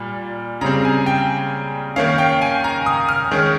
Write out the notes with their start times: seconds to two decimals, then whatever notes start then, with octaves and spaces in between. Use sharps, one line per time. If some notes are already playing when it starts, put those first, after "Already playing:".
Already playing: A#2 G3
0.61 C#3 G3 C4 A#5
0.85 G#5
1.06 G5
1.96 D#3 A#3 C#4 F5
2.18 G5
2.42 G#5
2.64 A#5
2.86 D#6
3.09 F6
3.31 D#3 G#3 C#4